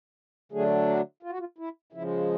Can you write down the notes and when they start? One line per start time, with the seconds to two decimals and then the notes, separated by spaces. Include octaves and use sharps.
0.52 D3 F#3 A3 D4 G#4
0.88 F#4
1.23 F4
1.30 F#4
1.39 F4
1.58 E4
1.92 C#3 F3 G#3 E4